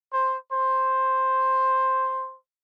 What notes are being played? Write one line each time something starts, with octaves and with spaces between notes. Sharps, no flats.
C5
C5